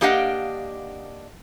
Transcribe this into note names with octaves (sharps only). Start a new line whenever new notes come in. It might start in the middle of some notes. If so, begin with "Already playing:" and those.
A#3 D4 G4 D#5 F5 F#5